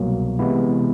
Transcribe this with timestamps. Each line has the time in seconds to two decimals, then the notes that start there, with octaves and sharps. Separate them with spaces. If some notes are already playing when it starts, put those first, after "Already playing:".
Already playing: C2 B2 F#3 A#3
0.39 C3 E3 G#3 B3 E4